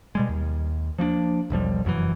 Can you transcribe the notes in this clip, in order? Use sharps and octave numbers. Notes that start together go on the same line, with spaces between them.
B2 G3 G#3
D#2
F3 A#3 B3 D4
E1 B1 F3 G3
F1 F#2 B2 E3